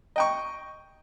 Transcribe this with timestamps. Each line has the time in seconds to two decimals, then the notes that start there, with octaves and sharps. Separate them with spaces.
0.16 D#5 G5 C#6